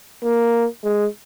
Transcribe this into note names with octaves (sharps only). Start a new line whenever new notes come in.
A#3
G#3